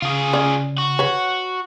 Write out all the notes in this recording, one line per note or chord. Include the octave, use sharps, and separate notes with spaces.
C#3 F4 G#4
C#4 D5
F#4
B4 C#5